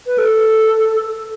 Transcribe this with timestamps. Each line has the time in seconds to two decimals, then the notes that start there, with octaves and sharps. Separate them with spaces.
0.07 B4
0.18 A4